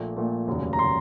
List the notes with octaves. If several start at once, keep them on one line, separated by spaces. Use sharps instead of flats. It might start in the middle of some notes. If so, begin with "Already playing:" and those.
Already playing: A#1 A#2 A3
A#1 A#2 A3
F1 D#2 C#3 F#3
A#5
C#3 F#3 C6